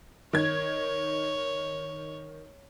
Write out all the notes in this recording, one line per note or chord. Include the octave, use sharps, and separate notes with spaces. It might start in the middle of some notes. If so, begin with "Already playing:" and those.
D#3 C#5 G#6